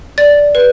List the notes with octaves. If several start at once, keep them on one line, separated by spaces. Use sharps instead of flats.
D5 A6
B4